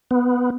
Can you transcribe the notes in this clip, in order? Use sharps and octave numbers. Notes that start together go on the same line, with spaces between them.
B3